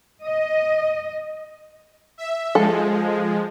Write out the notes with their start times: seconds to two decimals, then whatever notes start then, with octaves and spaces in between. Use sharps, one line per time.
0.22 D#5
2.18 E5
2.55 F3 G#3 A4